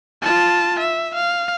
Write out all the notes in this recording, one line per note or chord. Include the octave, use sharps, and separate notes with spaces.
F4 A5
E5
F5